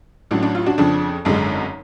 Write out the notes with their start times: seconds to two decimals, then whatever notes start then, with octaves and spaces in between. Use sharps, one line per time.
0.31 A1 A2 F#3 D4
0.43 D4
0.55 F4
0.66 D4 F#4
0.78 F2 C#3 F3 D4
1.25 G#1 F#2 D3 G#3 D4